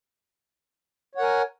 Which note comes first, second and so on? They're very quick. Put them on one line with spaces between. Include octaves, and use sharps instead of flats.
C#5 F#5 A#4 G#5